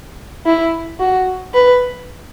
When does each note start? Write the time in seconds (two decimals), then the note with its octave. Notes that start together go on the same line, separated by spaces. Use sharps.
0.45 E4
1.00 F#4
1.54 B4